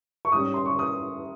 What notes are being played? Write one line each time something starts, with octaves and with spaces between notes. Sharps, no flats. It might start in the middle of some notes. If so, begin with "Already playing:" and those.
C#6
G#2 G3 C#4 D#6
C6
C#6
D#6